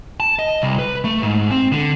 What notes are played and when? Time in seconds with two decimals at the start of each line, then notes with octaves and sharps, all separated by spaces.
0.20 A5
0.39 D#5
0.62 C2
0.79 B4
1.04 A3
1.23 G#2
1.51 C4
1.73 D3